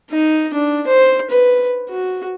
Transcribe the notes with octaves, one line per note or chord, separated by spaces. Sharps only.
D#4
D4
C5
B4
F#4